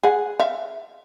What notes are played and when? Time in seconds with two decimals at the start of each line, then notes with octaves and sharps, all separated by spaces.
0.03 G#4 F#5
0.40 E5 F5